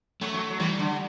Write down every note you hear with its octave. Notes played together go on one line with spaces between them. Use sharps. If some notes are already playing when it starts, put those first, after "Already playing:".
F#2 F#3 A3
F#2 F#3
F#3
E2 E3 G3
D3